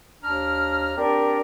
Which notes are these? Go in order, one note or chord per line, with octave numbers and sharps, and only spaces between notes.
D#2 D4 A#5 F6
C4 D4 G4 A#4 D5